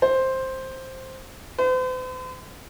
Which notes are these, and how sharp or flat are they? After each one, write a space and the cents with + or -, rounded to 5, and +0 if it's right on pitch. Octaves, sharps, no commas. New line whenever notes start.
C5 +5
C5 -45